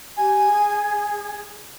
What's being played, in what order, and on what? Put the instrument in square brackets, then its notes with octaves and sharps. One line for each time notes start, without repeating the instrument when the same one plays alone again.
[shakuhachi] G4 [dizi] G#5
[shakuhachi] G#4